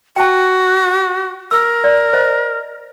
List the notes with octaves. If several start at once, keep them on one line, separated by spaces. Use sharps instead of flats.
F#4 G5 A5
A#4 E6
D5
C5 D#5